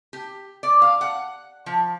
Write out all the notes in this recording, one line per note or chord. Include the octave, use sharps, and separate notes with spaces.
G4
D5
F5
F#5
F3